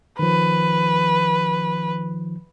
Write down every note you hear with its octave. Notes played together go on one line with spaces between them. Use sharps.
D#3 F3 B4